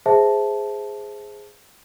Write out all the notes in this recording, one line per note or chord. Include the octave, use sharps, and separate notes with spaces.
G#4 C5 E5 A5